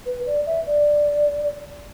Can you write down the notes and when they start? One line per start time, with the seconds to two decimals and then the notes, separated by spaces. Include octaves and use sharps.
0.06 B4
0.27 D5
0.46 E5
0.67 D5